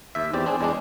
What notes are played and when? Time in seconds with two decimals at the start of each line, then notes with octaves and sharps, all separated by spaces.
0.15 D#2 E5
0.34 E2 C4 G4 D5
0.46 C4 D4 G#4
0.61 E2 G#3 D4